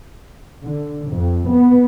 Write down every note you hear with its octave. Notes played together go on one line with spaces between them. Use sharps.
D3
F2
B3